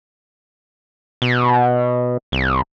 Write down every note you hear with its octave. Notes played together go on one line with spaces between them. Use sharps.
B2
C2